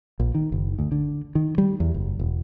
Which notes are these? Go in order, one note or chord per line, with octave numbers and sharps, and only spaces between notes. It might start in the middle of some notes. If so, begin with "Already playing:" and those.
A#1
D#3
F#1
D2
D3
D#3
G3
E2
F#1
E1